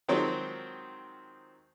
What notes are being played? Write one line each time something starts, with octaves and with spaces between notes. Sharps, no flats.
D#3 F3 F#3 G#3 C4